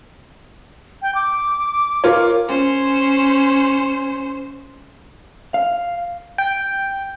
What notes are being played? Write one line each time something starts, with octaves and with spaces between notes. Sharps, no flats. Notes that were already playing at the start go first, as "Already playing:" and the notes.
G5
D6
F4 A#4 C#5
C#4 C5
F5
G5